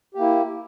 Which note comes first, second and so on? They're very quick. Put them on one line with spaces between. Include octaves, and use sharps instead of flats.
G4 A#3 E4